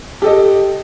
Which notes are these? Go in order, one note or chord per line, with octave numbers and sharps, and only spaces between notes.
G4 A4 D#5